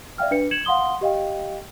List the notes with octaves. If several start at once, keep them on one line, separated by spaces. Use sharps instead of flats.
D5 E5 F5 G5 F6
D4 B4 C#7
G#6 C#7 E7 F#7
F5 F#5 C6 D#6 G7
G4 D#5 F5 G5